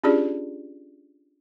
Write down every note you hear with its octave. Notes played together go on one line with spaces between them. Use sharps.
C#4 D4 F4 G4 G#4 D5